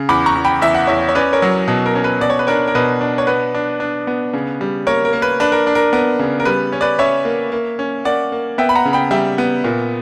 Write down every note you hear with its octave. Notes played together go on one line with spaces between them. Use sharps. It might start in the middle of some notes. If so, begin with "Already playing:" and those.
Already playing: C#3
E2 B5 D6
A#5 C#6
E2
G5 B5
E2 E5
F#5
E2 C#5 E5
C#5
C#4 B4 D5
A#4 C#5
F#3
B2
A#4
C#4
B4
B2 D5
C#5
B4
D4 A#4 C#5
A#4
B2 B4
D4
C#5
B3 B4
D4
D4
B3
C#3
G3
A#3 A#4 C#5
A#4
A#3
B4
D4 B4
A#4
D4
A#4
B3 A#4
C#3
A#4
G3 B4
C#4
B4 D5
C#4 C#5 E5
A#3
A#3
C#4
A#3 D5 F#5
A#3
B3 E5 G5
B5
F#5 A#5
C#3
G5 B5
G3 E5 G5
B3
A#2